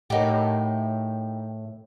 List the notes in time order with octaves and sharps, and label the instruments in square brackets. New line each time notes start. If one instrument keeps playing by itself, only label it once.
[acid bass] A2 [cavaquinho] D#4 G4 [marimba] A#4 C#5 F#5